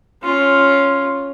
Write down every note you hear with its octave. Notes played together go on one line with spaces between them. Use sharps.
C#4 F4